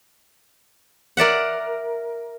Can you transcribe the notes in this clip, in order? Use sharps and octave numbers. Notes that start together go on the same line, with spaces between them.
A#4 D5 E5 F#5